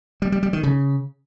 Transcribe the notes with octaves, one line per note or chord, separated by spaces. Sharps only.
G3
G3
G3
D#3
C#3